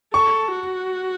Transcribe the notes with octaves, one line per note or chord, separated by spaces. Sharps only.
A4 C#6
F#4